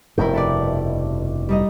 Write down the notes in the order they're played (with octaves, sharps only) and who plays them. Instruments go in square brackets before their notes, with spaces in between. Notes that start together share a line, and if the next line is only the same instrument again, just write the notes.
[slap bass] F1 G2 B2 [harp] E4 A#4 G5
[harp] A4 B4 D5
G3 D#4 D#5